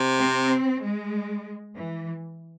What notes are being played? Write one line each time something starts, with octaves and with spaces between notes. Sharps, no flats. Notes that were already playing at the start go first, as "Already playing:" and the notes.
Already playing: C3
C4
G#3
E3